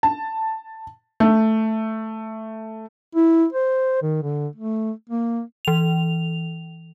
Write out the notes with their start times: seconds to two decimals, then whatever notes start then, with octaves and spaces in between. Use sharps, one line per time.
0.03 A5
1.20 A3
3.15 E4
3.53 C5
4.02 D#3
4.23 D3
4.56 A3
5.09 A#3
5.65 E3 F7